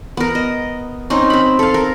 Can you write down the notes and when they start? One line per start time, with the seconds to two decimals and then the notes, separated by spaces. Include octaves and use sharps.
0.17 B3 A#4
0.35 D#5
1.10 C4 C#4 D#4
1.30 C4 B5
1.59 A4 F5
1.74 A#4